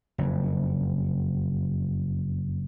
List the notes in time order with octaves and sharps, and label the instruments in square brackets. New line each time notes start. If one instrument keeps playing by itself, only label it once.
[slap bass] F#1 F2